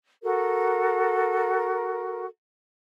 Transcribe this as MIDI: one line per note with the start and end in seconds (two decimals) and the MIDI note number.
0.23 2.26 66
0.23 2.26 69
0.23 2.26 70